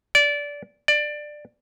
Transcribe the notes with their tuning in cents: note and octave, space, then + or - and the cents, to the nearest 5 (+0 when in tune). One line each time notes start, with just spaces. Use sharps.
D5 -20
D5 +15